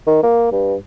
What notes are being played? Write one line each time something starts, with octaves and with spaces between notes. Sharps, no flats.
D#3
A#3
G2